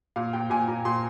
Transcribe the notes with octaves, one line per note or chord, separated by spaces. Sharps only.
A#2 F5
A#2 G5
A#2 G#5
A#2 A#5
A#2 C6